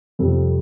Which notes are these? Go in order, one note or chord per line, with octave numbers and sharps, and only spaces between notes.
F2 C3 G3 A4